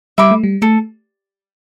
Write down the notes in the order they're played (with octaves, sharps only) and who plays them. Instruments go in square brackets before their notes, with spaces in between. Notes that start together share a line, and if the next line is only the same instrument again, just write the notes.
[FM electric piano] G3 [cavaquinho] E5 B5 D6
[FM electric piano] A3
G3
[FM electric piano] A3 [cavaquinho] A4